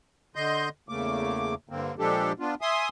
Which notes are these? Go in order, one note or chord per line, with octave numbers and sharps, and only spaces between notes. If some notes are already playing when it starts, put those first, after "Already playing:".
D3 D#5 C6 G6
E2 C#3 A3 A#3 D6
G2 D3 A#3 C4
A#2 F3 G#3 D4 G4 A4
B3 D4 F4
E5 G#5 C6 D#6